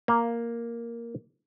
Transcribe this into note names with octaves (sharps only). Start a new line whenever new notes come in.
A#3